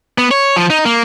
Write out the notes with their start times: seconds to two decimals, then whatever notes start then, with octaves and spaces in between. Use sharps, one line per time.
0.18 B3
0.31 C#5
0.56 F3
0.70 D#4
0.86 A#3